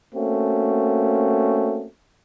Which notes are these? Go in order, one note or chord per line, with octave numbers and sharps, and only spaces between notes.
A3 A#3 C4 C#4 F#4